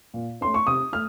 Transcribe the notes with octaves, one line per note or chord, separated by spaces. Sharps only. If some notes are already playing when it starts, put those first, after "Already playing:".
A#2
A3 C#4 C6
C#6
C3 D#6
A3 F6